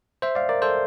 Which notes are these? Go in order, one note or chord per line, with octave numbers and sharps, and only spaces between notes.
C5 E5
D5 F5
A#4 D5
A4 C5